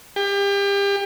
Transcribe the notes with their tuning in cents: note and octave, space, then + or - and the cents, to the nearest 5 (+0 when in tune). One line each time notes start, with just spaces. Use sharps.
G4 +30